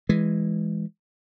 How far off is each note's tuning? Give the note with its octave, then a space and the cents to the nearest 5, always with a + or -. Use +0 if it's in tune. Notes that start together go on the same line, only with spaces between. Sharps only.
E3 +0 G#3 +0